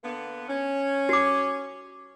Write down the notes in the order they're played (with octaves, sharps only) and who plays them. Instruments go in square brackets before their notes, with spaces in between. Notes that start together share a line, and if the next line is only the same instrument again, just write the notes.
[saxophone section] D3 A#3 B3
C#4
[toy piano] F#4 D6